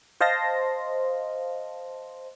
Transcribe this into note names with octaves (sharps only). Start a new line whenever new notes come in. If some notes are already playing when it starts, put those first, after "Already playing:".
C5 D#5 F5 A5 C6 A#6